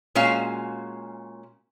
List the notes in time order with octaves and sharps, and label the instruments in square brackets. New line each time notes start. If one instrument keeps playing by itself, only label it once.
[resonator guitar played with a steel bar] A#2 G#3 C#4 F#4 F5